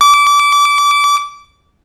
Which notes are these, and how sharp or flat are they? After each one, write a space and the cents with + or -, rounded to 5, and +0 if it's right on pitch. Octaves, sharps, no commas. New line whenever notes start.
D6 -25